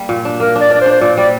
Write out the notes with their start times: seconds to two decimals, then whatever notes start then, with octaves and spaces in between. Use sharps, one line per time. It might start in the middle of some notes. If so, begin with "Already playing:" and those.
Already playing: G3 A#3
0.09 A#2
0.25 D4
0.40 A#3 A#4
0.56 D4 D5
0.70 D4 D5
0.81 C5
0.86 D4
0.91 C5
1.01 A#2 D5
1.17 G3 D5